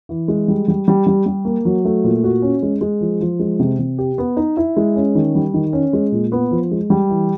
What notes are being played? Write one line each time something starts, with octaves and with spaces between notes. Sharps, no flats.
E3
G#3
G3
G3
G3
G3
G3
A#3
F#3
A3
A#2
F#4
C#4
G#3
G#3
F3
F3
G#3
C3
C3
G4
B3
D#4
E4
G#3
C#4
D#3
G3
D#3
C#4
G#3
A#2
B3
F3
G#3
G3
E3